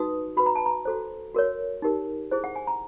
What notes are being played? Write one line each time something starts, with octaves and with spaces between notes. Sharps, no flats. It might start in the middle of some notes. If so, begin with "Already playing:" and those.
Already playing: D#4 F#4 B4 D#6
F#4 B4 B5
A#5
A5
A#5
F#4 A4 C5
F#4 A#4 C#5
D#4 G4 A#4
E4 G#4 C5
F#5
G#5
A#5